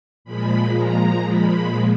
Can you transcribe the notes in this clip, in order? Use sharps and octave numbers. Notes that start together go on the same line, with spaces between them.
A#2 F3 G#3 B5
A#5
B5